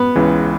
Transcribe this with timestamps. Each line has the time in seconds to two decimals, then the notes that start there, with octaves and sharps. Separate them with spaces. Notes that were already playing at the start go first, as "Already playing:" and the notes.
Already playing: B3
0.16 C#2 C#3 E3